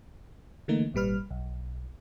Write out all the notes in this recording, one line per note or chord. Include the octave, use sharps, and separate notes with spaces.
D3 E3 A3 A#3 D#4
G#1 A#2 G3 B4 F6
B1